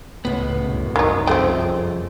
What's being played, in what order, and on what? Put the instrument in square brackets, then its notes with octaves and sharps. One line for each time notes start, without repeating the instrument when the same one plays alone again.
[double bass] C#2 [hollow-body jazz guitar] A2 B3
[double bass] C2 F#2
[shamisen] D#3 D#4
[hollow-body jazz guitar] F2 G#4 G5 [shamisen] A3 C4